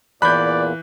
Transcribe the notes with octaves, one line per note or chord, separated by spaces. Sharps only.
E2 A#2 E3 D5 B5 F#6 G6